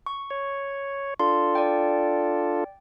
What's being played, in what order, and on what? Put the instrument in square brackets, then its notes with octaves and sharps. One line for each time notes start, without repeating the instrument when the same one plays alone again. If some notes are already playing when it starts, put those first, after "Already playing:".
[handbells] C#6
[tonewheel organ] C#5
[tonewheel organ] D4 F4 A4 [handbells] C6
[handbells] D5 G5